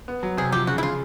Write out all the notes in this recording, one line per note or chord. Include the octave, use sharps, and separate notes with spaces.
B3
F#3
C3 G#4
F3 G4
C#3 F#4
E4
C#3 F4